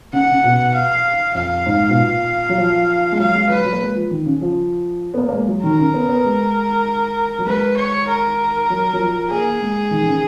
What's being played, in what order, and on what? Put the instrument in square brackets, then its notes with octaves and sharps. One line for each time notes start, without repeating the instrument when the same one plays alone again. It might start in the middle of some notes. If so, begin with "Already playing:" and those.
[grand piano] C#3 [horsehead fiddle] F#5
[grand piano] C#3
B2
[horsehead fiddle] F5
[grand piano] F2 [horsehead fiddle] F5
[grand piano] G#2
B2
A#2
F#3
F3
G#3
[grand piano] F#3 [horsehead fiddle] F5
[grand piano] G#3
[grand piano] F#3 [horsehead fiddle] B4
[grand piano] F#3
A#3
G#3
F3
D#3
C#3
F3
B3
A#3
A#3
G#3
F#3
[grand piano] D#3 [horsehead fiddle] A#4
[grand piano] C#3
B3
B3
G#3
F#3
[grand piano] G#3 [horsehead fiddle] B4
[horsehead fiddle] C#5
A#4
[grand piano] F#3
F#3
F3
[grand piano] A#3 [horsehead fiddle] G#4
[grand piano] G#3
D#3
D#3
C#3